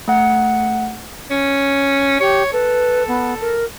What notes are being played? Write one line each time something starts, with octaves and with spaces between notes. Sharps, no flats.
A3 F#5
C#4
G4 C#5
A4 B4
B3
A#4